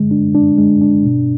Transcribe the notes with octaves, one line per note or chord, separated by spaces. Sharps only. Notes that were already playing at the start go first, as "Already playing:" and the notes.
Already playing: D3 G#3
D4
D4
G#3
D4
B2